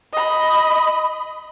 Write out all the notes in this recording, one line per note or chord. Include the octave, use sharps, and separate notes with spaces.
D#5 B5